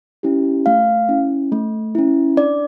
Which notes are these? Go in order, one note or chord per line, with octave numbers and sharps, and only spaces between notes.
C#4 E4 G4
A3 F5
C#4 E4
A3
C#4 E4
D4 D5